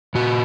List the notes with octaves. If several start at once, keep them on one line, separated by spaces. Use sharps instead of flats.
A#2 F#4